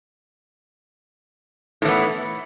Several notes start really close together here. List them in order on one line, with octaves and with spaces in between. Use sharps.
A2 E3 B3